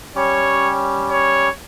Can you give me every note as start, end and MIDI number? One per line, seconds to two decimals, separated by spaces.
0.16 1.49 55
0.16 1.49 61
0.16 1.49 67
0.16 0.72 73
1.09 1.53 73